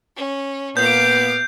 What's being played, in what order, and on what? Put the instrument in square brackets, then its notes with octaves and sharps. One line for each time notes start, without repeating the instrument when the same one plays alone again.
[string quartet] C#4
[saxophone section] A#2 B3 [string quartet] F5 D6 [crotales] G6